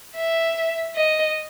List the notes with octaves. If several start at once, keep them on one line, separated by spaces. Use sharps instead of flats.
E5
D#5